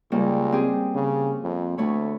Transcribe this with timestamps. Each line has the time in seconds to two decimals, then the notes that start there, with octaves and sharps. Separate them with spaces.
0.12 C#2 G3 A#3 C#4
0.52 C4 G4 G#4
0.95 C#3
1.43 F2
1.78 D2 A3 C#5 B5